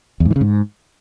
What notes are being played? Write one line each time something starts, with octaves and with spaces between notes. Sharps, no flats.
E2
G#2
E3
C#3
G#2